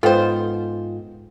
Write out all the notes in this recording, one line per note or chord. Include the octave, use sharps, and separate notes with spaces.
G#2 B3 F4 A4 B4 C5 G5